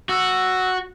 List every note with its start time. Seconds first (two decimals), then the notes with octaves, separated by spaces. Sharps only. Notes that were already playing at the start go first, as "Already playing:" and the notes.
0.09 F#4 E6